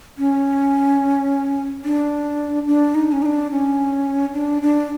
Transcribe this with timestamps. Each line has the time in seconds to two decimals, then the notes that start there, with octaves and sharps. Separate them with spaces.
0.18 C#4
1.85 D4
2.67 D4
2.95 D#4
3.12 C#4
3.22 D#4
3.26 D4
3.51 C#4
4.33 D4
4.62 D4